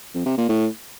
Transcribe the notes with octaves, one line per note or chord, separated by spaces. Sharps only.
F2
C3
A#2
A2